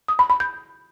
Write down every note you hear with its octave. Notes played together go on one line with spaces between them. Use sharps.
D#6
B5
B5
G6